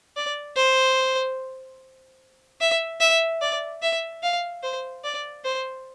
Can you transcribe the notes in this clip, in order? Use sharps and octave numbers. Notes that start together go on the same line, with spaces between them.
D5
C5
E5
E5
D5
E5
F5
C5
D5
C5